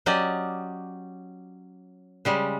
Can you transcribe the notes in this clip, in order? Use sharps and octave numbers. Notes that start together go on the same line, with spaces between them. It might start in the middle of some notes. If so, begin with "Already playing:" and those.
F#3 C#4 G4 D5 D#5
C#3 G3 G#3